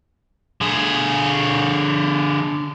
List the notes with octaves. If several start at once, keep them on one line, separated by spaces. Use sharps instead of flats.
D3 G#4